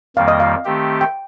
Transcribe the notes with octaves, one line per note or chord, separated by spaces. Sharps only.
F2 D#3 G3 A#3 F5
D#5
F5
D#3 A3 C4 G4
G5